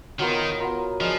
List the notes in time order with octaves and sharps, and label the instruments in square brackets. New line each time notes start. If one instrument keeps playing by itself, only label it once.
[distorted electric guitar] D#3 [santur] F#3 B3 F4 A#4
[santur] F#3 B3 F4 A#4
[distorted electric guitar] F3 [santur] D4 G#4 D#5